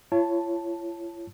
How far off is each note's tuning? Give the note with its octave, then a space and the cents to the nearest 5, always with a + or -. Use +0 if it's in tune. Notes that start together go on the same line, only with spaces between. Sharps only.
F4 -45 C#5 +0 A5 +0